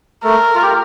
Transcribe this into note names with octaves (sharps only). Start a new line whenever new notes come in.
A3 A4 A#4
F4
G4